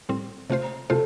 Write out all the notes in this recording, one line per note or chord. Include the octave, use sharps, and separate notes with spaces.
A2 G3 C4
C3 A3 F4 C5
C3 A3 F4 A4 C5